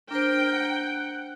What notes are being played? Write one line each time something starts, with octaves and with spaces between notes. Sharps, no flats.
D4 A#4 C5 G5
F#5